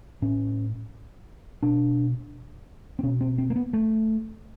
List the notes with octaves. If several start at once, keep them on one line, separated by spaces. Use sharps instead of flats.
A2 C#4
B2 D4
C4
B2 C#4
C4
C4
A#3
B3
A3